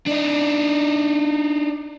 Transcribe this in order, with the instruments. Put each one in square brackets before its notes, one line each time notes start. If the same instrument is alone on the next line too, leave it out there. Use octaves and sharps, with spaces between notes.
[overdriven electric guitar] D4 D#4